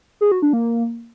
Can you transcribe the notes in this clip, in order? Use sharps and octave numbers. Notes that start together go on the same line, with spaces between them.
G#4
F#4
D4
A#3